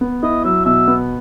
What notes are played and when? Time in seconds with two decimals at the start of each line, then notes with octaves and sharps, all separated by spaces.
0.01 B3
0.23 E4 D#5
0.44 F#3 E5
0.65 B2 E5
0.88 B3